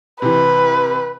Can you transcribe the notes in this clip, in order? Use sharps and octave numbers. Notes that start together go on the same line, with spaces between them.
C3 E3 B4